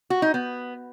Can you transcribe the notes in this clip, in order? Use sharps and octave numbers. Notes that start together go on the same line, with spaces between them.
F#4
D#4
B3